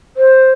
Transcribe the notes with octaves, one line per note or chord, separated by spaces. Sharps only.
C5